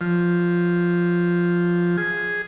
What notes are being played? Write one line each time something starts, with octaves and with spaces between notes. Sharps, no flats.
F3
G#4